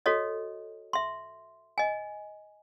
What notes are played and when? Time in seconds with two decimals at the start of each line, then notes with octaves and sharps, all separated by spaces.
0.06 F#4 A4 C#5 D#5
0.93 E5 C6
1.78 D#5 G#5